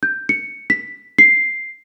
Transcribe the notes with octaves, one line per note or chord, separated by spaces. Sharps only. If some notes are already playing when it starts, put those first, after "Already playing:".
G6
C#7
B6
C7